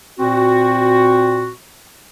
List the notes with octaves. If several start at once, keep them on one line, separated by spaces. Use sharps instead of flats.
A#2 C4 F#4